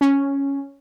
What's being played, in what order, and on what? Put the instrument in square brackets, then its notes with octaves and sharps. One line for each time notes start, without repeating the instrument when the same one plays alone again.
[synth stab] C#4